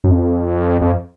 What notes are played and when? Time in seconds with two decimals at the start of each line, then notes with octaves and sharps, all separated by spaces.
0.04 F#2
0.11 F2
0.82 F2